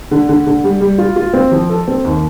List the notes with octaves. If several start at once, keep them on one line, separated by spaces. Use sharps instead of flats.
D3
D3
D3
G3
G3
F4
F4
C4
F3
A4
C4
D#2